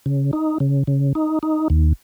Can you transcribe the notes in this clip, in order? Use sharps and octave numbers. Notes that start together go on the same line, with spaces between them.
C#3
D#4
C#3
C#3
D#4
D#4
D#2